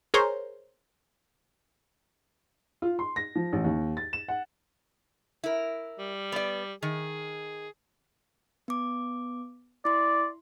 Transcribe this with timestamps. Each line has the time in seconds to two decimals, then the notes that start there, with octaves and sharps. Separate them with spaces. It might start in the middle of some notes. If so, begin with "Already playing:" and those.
0.14 G#4 A#4 C5 C#5
2.82 F4
2.99 C6
3.16 A#6
3.35 F3
3.53 A1
3.64 D#2
3.97 A6
4.13 E7
4.28 F#5
5.44 E4 A#4
5.99 G3
6.32 B3 D5
6.83 D#3 G#4
8.68 B3 D6
9.85 E4 D5 C6